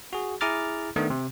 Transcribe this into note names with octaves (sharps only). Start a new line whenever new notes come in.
F#4 G#4
E4 G#4 A#5 D6 F6 A6
D#3 A3 B3 D4
C3